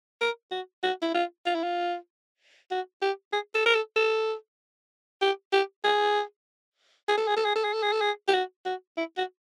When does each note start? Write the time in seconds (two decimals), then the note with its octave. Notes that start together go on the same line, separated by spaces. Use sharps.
0.21 A#4
0.51 F#4
0.83 F#4
1.02 E4
1.14 F4
1.45 F4
1.55 E4
1.63 F4
2.71 F#4
3.02 G4
3.33 G#4
3.55 A4
3.66 A#4
3.75 A4
3.96 A4
5.22 G4
5.52 G4
5.84 G#4
7.08 G#4
7.17 A4
7.28 G#4
7.36 A4
7.45 G#4
7.55 A4
7.64 G#4
7.73 A4
7.83 G#4
7.92 A4
8.01 G#4
8.28 G4
8.34 F#4
8.65 F#4
8.97 E4
9.17 F#4